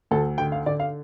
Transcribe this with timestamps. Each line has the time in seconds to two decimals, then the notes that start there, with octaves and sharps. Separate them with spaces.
0.11 D2 A4
0.38 D3 G5
0.52 F5
0.66 D3 D5
0.80 F5